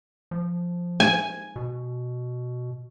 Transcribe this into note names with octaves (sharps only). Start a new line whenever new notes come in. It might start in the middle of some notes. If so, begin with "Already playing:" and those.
F3
G#5
B2